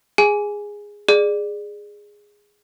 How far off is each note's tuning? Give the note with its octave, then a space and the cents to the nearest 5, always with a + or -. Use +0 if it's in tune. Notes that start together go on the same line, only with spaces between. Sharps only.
G#4 -10 G#5 +0
G#4 -5 D5 +20